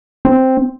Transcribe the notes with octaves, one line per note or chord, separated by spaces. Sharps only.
C4